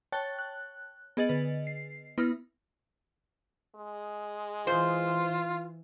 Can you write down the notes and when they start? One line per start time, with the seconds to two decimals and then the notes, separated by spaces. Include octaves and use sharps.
0.12 C#5 G5 A5 C#6 F#6 A6
0.39 F#6
1.17 B3 G#4 D#5 A6 F#7
1.29 D3 B4
1.67 C7
2.18 B3 E4 B5 D#6 F6 A#6
3.75 G#3
4.67 E3 F4 C5